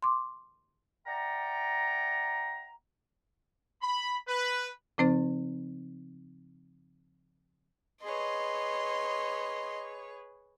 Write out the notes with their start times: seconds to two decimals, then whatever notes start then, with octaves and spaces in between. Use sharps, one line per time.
0.02 C6 D6
1.07 D5 E5 F#5 G5 A#5
3.81 B5
4.27 B4
4.98 C#3 F3 C4 D#4 C5
8.03 G#4 B4 C#5 D#5 C6